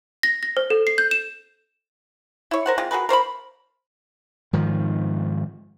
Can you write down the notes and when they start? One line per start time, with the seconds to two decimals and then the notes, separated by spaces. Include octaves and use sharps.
0.23 A#6
0.43 A#6
0.57 C5
0.70 A4
0.87 C7
0.98 G6
1.11 E7
2.51 E4 C#5
2.66 A#4 C5 F#5
2.78 G#3 C4 F4
2.91 F#4 G#4 A#4 B4
3.09 A#4 C5 C#5 B5
4.53 G#2 D#3 F3